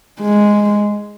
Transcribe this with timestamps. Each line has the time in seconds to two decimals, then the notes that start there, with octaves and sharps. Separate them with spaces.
0.20 G#3